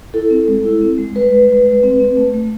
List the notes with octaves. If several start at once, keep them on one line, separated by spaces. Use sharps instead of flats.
E4 A4
C4
G#3
E4
C4
G#3
G#3 B4
G#3
G#3
G#3
C4
C4
A3
A3